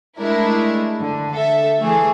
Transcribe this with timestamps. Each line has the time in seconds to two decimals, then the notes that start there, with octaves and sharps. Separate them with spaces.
0.19 G#3 A3 D4 E4 A#4
1.01 D3
1.35 A4 E5
1.79 E3 A3 G#4